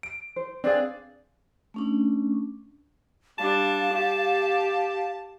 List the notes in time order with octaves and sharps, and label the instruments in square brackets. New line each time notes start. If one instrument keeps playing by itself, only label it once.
[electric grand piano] D7
[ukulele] C5
[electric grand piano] C4 G#4 [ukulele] D4 B4 F5 [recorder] D5
[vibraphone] A3 C#4 D4
[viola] G3 D4 [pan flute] F5 [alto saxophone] A5
[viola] G4